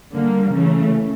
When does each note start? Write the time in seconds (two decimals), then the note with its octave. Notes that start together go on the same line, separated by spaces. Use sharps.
0.13 D3 G3 A#3
0.52 C#3 E3 A3